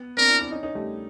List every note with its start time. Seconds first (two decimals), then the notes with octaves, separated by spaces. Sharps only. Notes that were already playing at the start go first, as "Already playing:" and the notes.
Already playing: B3
0.17 C4 D4 A#4
0.28 D4 E4
0.41 D4 E4
0.51 C#4 D#4
0.63 C#4 D#4
0.75 G3 A3